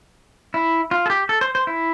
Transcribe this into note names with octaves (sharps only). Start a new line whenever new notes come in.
E4
F4
A4
G4
A4
C5
C5
E4